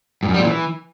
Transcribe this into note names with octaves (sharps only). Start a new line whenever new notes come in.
G2
F#2
G3
A#2
E3